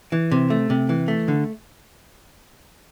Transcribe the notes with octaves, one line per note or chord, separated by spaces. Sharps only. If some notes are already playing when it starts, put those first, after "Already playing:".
E3
C3
A3
C3
E3
A3
D3